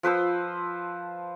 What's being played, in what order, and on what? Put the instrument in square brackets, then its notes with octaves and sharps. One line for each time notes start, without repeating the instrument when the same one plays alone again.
[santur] F3 B4 C5 E6